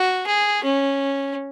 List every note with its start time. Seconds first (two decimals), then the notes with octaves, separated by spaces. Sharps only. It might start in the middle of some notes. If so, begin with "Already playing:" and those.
Already playing: F#4
0.27 G#4
0.64 C#4